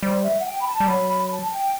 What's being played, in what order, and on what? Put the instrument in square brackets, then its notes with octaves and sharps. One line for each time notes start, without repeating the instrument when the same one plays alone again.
[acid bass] G3 [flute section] C5
[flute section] E5
F#5
G5
B5
A5
[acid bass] G3
[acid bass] F#3 [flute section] B5
[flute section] B5
A5
G5